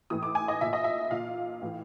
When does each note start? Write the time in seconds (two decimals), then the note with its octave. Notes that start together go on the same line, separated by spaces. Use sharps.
0.10 A2 E3 D#6
0.23 D6
0.35 G#5
0.48 D#5
0.61 A#2 E5
0.73 D#5
0.84 E5
1.11 A#2 F5
1.62 A2 E3